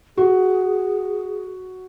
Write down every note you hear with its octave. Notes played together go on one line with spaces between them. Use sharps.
F#4 G#4